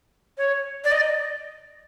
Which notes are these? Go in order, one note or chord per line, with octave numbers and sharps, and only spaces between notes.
C#5
D5
D#5